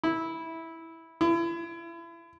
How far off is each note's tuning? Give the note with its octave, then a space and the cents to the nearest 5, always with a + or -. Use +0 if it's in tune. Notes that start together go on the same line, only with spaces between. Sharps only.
E4 -10
E4 +35